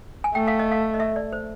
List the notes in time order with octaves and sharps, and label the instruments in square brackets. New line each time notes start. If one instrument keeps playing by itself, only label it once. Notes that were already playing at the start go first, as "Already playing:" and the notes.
[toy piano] G#5
[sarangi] A3 [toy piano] G5
[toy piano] F5
D#5
F5
D#5
E5
D5
C5